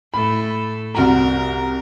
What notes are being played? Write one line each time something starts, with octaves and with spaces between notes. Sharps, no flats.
A2 A4 B5
C2 F#4 A#4 A#5